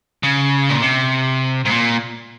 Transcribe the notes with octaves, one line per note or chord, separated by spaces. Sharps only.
C#3
A#2
C3
G#2
A#2